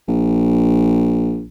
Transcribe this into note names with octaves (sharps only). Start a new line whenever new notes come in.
A#1